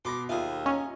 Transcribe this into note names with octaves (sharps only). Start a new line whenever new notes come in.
B2 B5 C6 D6 A#6
D#2 F4 G#4 E5
C#4 D#5 G#5 A#5